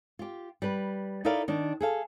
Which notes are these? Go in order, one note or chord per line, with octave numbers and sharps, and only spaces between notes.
F4 G4
G3 B4
D#4 E4 A4 A#4 D5 F5
D#3 D4
G#4 A4 F5